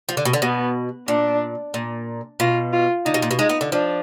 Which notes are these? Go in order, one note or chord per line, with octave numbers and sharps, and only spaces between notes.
F3
D3
B2
D3
B2 B3
A#2 D4
A#2
B2 F4
F4
D3 D#4
B2
A#2
B2
G#3 D#4
B3
D3
F3 D4